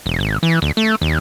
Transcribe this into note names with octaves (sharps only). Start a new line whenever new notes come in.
E1
G#1
E3
D2
A3
D#2